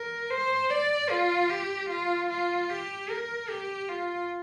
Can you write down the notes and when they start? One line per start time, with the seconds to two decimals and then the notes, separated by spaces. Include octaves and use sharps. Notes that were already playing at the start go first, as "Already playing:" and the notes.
Already playing: A#4
0.30 C5
0.70 D5
1.10 F4
1.50 G4
1.89 F4
2.29 F4
2.69 G4
3.09 A#4
3.49 G4
3.89 F4